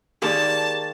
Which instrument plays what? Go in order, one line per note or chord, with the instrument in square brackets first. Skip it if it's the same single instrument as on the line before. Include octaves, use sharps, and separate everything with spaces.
[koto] D#3 G#3 A#3 [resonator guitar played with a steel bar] G4 G#4 D5 [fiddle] A5